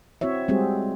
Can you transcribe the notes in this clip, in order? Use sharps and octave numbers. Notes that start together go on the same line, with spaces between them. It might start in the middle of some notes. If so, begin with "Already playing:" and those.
C4 E4 F#4 C#5 E5
G3 G#3 C4 F#4 G#4